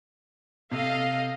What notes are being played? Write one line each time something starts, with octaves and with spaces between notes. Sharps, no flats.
C3 A4 D#5 F5